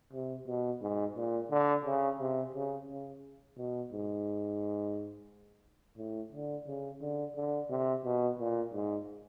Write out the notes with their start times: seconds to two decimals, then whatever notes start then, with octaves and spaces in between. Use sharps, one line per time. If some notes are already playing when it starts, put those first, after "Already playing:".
0.13 C3
0.47 B2
0.81 G#2
1.16 A#2
1.50 D3
1.85 C#3
2.20 C3
2.54 C#3
2.88 C#3
3.57 B2
3.92 G#2
5.98 A2
6.32 D3
6.67 C#3
7.01 D3
7.36 D3
7.70 C3
8.04 B2
8.39 A#2
8.73 G#2